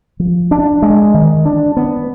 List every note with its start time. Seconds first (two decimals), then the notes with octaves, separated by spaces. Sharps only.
0.20 F3
0.51 D4
0.82 G#3
1.14 D#3
1.45 D4
1.77 B3